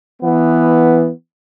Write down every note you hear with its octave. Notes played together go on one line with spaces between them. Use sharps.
E3 B3